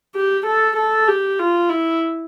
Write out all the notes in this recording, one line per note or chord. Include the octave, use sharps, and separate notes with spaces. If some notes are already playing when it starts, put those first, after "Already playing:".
G4
A4
A4
G4
F4
E4